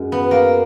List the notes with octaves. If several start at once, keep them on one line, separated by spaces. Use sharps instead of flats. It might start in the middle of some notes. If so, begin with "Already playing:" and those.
Already playing: F#2 G#3
B3
A#3